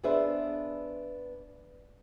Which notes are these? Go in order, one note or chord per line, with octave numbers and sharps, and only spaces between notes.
B3 D4 G#4 B4 C5 E5